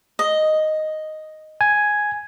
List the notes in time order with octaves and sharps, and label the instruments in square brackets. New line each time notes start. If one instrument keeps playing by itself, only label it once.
[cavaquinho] D#5
[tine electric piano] G#5